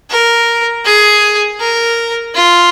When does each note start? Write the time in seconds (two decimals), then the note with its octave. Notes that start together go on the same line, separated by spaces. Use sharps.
0.11 A#4
0.85 G#4
1.60 A#4
2.35 F4